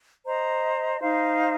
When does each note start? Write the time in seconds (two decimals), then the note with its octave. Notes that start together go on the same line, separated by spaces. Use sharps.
0.24 C5 D#5 A#5
1.01 D#4 C5 F5